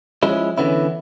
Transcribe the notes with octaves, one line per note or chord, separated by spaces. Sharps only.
F3 G#3 C#4 E4
D3 E3 B3 C#4 E4